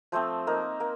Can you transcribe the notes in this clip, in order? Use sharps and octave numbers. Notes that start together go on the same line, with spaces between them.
F3 A3 C4 C5
A#3 D#4 A#4
A#3 A#4